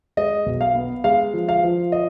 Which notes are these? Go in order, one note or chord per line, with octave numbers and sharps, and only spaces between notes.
G#3 D#5
B1
F5
B3
G#3 F5
F3
F5
F3
D#5